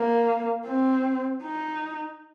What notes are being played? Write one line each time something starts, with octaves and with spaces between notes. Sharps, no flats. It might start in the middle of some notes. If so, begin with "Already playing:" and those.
Already playing: A#3
C4
D#4